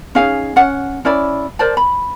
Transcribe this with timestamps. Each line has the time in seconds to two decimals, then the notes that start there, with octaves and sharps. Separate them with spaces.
0.15 C#4 D#4 G#4 F5
0.56 C#4 F#5
1.05 C#4 E4 D5 B5
1.59 A#4 C5 D5 A5
1.77 B5